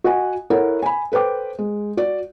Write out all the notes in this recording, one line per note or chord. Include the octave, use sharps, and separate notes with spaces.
F#4 D#5 F#5 G#5
E4 A4 A#4 C#5 F#5
G#5 B5
A4 B4 C5 G5 D6
G#3
F#4 D5